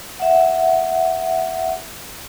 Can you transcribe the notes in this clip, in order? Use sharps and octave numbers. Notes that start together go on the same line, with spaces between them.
E5 F#5